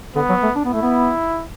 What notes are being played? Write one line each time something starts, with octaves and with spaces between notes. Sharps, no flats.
D3 B3
F#3
A3
D4
B3
A3 E4
B3